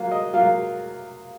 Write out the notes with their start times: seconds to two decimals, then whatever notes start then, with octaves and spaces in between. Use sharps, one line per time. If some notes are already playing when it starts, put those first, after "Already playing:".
Already playing: F#3 A#3 F4 F5
0.11 D#5
0.34 F#3 A#3 F4 F5